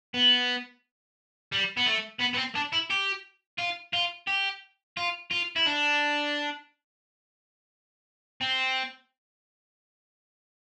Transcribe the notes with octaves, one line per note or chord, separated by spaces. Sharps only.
B3
G3
B3
A3
B3
B3
C4
D4
E4
G4
F4
F4
G4
F4
F4
E4
D4
C4